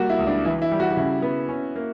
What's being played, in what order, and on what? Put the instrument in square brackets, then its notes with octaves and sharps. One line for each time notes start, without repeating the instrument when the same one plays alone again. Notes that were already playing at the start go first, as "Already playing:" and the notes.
Already playing: [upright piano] G3 A#3 F#4
E4
[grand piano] C#2
[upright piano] D4
[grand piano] E3 [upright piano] E4
[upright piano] E4
[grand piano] G3
[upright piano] F#4
F#4
[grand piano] C#3 [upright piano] E4
[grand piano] B3
C#4
A#3